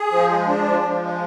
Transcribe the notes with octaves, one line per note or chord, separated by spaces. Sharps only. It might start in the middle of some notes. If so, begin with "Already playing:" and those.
Already playing: G#4
F3
G#3
D4
F3
F3
G#3